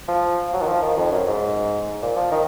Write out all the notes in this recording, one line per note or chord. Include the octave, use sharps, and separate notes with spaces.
F3
F#3
D#3
F3
D#3
F2
F#2
G#2
A#2
F3
D#3